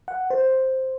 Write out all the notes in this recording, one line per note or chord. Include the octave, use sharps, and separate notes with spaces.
F#5
C5